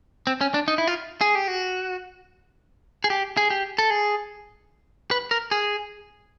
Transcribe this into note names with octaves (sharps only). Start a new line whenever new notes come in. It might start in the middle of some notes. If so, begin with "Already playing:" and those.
C4
C#4
D4
D#4
E4
F4
G#4
G4
F#4
G#4
G4
G#4
G4
A4
G#4
B4
A#4
G#4